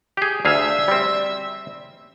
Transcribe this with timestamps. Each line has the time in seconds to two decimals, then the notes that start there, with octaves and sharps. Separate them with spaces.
0.17 G4 G#4 G6
0.45 D2 G#4 E5 F5
0.88 G3 C4